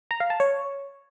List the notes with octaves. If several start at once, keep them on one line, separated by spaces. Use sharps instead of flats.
A#5
F5
A5
C#5